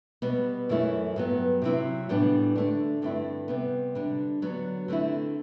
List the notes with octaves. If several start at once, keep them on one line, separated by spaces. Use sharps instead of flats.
B2 G3 B3
F#2 E3 A3 E4
G2 F#3 B3
C3 F#3 C4 E4
A2 E3 G3 B3 D4
D3 A3 D4
G2 D3 A3 C4 E4
C3 G3 B3
D3 G3 D4
D3 F#3 B3
D3 A3 C4 E4